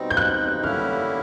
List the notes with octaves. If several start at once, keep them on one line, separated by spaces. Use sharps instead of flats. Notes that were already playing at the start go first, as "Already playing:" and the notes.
Already playing: B2 G3 C4 D#4
G6
F#6
D3 G3 A#3 C#4 E4 F6